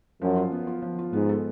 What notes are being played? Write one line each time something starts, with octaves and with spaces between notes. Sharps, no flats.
F#2 F3
F4
B3
F4
F3
F4
G#2 B3
A4